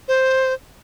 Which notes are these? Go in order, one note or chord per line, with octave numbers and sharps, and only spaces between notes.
C5